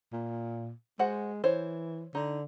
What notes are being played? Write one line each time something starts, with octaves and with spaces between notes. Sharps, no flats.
A#2
G#3 F#4 C5 F#5
E3 C5 C#5
D3 D#4